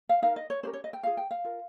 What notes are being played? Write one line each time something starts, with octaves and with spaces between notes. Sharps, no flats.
F5
D#4 A#4 F5
D#5
C#5
C#4 G4 A#4 C5
C#5
D#5
G5
F4 G#4 F5
G5
F5
F4 A#4